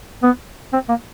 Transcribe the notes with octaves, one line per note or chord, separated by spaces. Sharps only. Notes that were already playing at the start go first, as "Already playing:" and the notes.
B3
C4
A#3